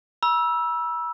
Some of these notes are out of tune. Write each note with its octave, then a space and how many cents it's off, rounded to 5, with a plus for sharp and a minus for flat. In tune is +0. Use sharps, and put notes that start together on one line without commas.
B5 -40 E6 +0